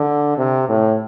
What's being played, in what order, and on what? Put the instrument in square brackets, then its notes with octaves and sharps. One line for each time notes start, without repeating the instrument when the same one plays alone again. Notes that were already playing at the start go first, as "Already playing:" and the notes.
Already playing: [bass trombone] D3
C3
A2